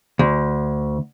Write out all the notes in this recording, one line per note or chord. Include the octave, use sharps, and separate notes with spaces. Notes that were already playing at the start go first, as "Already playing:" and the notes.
D2